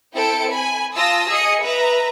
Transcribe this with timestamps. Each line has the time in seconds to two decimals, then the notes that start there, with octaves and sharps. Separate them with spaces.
0.15 C4 E4 A4 G5 C#7 D7
0.52 G#5 B5
0.95 F4 A5 D#6 E6 A#6
1.30 G#4 D#5 D#6 C#7
1.63 B4 E5 A#5